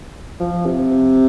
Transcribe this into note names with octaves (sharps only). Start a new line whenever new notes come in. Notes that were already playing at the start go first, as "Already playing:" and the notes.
F3
C3